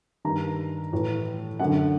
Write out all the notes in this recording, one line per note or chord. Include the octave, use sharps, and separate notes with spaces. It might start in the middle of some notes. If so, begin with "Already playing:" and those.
G2 D#3 A#5
A2 E3
F#2 F#5
D3